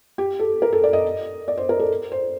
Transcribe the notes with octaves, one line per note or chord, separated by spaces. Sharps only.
G4
A4
A#4
A4
D5
D#5
D5
C5
A#4
A4
C5